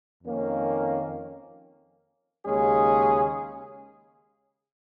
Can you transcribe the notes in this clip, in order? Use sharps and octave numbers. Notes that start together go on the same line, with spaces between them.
F2 D#3 A#3 C#4
D#2 C#3 G#3 C#4 G#4